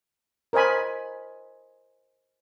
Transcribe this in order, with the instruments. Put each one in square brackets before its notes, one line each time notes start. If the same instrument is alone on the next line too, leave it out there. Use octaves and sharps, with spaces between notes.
[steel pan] A#4 C5 D#5 G#5 B5